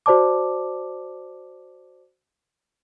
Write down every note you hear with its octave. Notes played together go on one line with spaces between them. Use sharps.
F#4 C5 D5 A5 D6